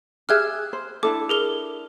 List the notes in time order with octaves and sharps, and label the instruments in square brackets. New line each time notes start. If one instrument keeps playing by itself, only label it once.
[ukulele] G4 G#4 E5 [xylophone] F6 F#6 G#6
[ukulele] C5
[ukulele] D4 E4 A4 [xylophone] D6
[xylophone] G#4 A#4 G7